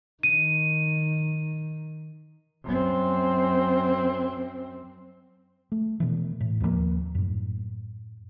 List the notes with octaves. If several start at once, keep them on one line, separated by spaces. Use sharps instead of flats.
D#3 D#7
F#2 C4
A3
B2 E3
A2
D#2 F3 F#3 A#3
F#2 A2